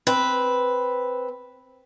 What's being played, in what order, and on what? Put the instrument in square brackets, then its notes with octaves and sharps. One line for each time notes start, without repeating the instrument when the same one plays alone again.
[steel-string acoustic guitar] C4 B4